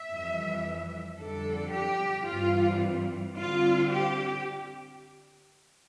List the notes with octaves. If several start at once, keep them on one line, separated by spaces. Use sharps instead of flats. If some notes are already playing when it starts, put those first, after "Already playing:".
Already playing: E5
F2 E3 G3
F2 D3 G3 D4 A4
G4
G2 E3 G3 C4 F4
D3 G3 C4 F4
G4